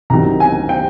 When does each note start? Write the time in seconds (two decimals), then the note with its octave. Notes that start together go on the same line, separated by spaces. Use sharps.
0.10 C2 C3 D#3 F#3 A#5
0.40 G#5
0.69 G5